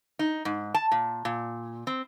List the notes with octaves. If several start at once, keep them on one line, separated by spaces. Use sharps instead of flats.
D#4
G#2
A5
A#2
A#2
C4